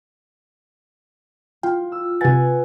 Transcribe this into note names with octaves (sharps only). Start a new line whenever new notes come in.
F4 G5
E6
C3 B4 F#5 G#5 A6